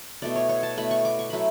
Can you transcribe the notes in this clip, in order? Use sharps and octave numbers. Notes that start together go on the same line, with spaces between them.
B2 A3 E4 D5
C#5
C#5
A5
B2 A3 E4 B5
C#6
D6
C#6
F#3 A3 E4 B5